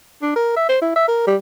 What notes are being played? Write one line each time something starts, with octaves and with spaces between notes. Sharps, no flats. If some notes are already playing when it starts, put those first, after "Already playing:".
D4
A#4
E5
C5
E4
E5
A#4
G3